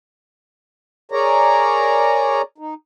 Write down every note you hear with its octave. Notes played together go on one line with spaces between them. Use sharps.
G#4 A#4 C#5 D5 A#5
D#4